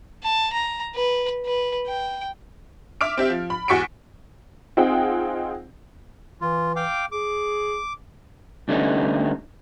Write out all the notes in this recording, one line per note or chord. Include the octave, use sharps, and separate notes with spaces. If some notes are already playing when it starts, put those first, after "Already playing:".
A5
A#5
B4
B4
G5
E5 D6 F6 D7
C4 G4 E5
F3
B5
E2 F#4 C#6 B6 C#7 D7
C4 D#4 F4 G#4 F#5 G5
E3 F4
F5 G5 D6
G#4 D6
D3 G3 A3 B3 C#4 D#4